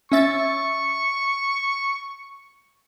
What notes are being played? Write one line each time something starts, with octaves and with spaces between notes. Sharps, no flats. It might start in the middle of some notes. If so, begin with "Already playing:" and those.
C#4 E5 C#6 A6